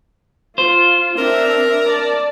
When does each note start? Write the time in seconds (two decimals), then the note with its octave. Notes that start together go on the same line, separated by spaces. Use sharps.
0.58 F4 C5
1.18 C4 D4 A#4 E5
1.86 D5 A5